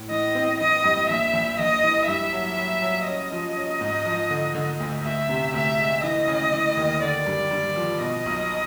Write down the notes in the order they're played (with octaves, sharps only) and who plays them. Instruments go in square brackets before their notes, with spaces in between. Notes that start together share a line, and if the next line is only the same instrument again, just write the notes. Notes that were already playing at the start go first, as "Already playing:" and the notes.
Already playing: [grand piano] A2
[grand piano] E3 [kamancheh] D#5
[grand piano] C4
[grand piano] E3 [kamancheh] D#5
[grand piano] G2
[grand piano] A#1 [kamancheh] E5
[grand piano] A#1
[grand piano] A#1 [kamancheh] D#5
[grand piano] E3
[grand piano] G2 [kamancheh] E5
[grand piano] F#3
F#3
F#3
[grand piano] C#4 [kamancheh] D#5
[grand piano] F3
C#4
G#2
F3
D3
D3
D2
[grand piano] D2 [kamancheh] E5
[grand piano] C3
[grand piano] D2 [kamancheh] E5
[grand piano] G#3
[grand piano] E3 [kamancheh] D#5
[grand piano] C#3
E3
D#2
[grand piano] D3 [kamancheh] D5
[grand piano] G2
G2
F3
[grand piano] B2 [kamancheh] D#5
[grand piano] B1